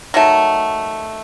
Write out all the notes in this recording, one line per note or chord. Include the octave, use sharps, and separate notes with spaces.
D#3 F#3 A3